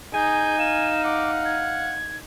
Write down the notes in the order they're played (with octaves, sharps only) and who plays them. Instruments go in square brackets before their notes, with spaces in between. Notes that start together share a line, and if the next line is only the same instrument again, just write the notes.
[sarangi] D#4 [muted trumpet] G#4 [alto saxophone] G#5 [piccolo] G6
[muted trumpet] F5 [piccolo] E7
[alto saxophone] F#5 [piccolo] D6
[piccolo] G#6